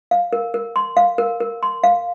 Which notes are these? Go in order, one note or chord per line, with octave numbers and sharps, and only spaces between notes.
F5
A#4
A#4
C6
F5
A#4
A#4
C6
F5